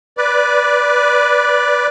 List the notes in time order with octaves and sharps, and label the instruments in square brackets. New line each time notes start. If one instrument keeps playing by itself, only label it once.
[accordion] B4 D5